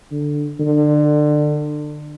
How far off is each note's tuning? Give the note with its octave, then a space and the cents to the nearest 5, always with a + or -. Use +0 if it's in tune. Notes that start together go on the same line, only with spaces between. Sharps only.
D3 +5
D3 +25